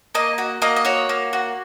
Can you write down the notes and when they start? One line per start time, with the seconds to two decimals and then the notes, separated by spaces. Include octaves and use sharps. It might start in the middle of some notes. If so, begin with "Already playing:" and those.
0.15 A#3 D#5
0.38 F#4
0.62 A#3 D#5
0.76 D#5
0.85 F#4 C#5
1.09 A#3
1.33 F#4